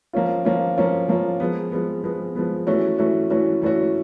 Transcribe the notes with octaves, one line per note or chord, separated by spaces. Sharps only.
F3 A#3 C#4 F4
F3 A#3 C#4 F4
F3 A#3 C#4 F4
F3 A#3 C#4 F4
F3 G#3 B3
F3 G#3 B3
F3 G#3 B3
F3 G#3 B3
E3 A3 C#4 F#4
E3 A3 C#4 F#4
E3 A3 C#4 F#4
E3 A3 C#4 F#4